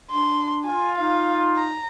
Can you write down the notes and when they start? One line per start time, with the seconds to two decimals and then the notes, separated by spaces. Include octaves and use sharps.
0.11 D4 C6
0.65 F4 G#5
0.98 D#4 F5
1.57 A#5